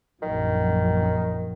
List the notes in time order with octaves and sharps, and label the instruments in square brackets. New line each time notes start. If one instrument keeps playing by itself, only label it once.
[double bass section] A#1 F#2 F#3 [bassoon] D#3